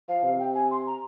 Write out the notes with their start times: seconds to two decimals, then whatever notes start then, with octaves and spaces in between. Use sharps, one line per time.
0.09 F3 F5
0.24 C3 F5
0.39 G5
0.55 G#5
0.71 C6
0.87 A#5